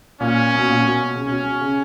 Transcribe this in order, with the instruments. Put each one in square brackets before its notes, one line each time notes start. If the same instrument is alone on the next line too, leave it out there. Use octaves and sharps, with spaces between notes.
[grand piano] A#2 [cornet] C#4
[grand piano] B2
A#2
B2
C#3
[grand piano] B2 [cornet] C#4
[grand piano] B2
C#3